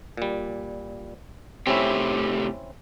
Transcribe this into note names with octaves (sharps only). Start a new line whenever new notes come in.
A#2 G3
A2 C3 C4 C#4 E4